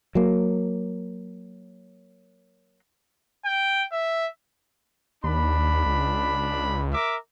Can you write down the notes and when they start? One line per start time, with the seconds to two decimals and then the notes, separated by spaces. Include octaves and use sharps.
0.15 F#3 A#3
3.45 G5
3.92 E5
5.24 D#2 D4 B5
5.86 C#2
6.93 A#4 E5 D6